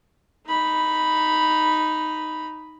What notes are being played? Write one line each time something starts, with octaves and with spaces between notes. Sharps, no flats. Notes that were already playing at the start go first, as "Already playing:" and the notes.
D#4 B5